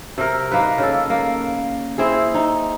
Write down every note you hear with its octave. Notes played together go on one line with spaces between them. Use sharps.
C3 A#4
A#3 D#4 B4
C#3 A4
A#3
C4 E4 G#4
D#4